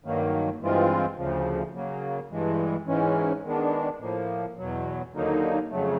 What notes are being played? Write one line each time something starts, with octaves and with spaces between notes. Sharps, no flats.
G2 D#3 F#3 A#3
G2 E3 G#3 C4 F4
D2 C#3 F3
C#3 F#3 A#3
G2 E3 G#3
G#2 E3 G#3 C#4
D#3 G#3 B3 D4
A2 F3 A#3
E2 B2 F#3
D#2 D3 F#3 A#3 D#4
F2 C#3 F#3 A3